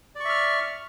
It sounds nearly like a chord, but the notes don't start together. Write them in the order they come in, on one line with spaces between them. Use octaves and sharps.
D5 C#6 E5 F6